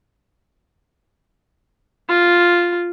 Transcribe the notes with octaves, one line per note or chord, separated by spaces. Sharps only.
F4